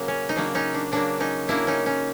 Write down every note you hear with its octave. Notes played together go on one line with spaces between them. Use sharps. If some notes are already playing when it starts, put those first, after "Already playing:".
Already playing: C#3 F#3 A#3
C#4
D#4
C#3 F#3 A#3 D4
C#4 D#4
D4
C#3 F#3 A#3 D4
C#4 D#4
C#3 F#3 A#3 D4 E4
C#4 D#4
C#4